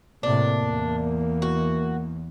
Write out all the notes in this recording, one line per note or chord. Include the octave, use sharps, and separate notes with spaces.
A2 C3 A#3 D4
E2 E3
F#4